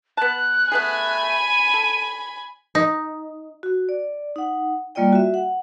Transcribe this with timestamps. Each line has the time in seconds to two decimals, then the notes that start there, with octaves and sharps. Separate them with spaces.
0.17 B3 A5 F#6
0.72 A3 B3 G#4 G#5 B5
1.29 D#7
1.74 A4
2.75 D#4
3.63 F#4
3.89 D5
4.36 D#4 F#5
4.95 G3 A#3 F4 D5 D#5 G5
5.12 F#4 E5
5.34 F#5